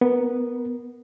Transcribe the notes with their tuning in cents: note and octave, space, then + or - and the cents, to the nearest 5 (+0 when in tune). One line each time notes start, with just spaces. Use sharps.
B3 +0 A#4 +15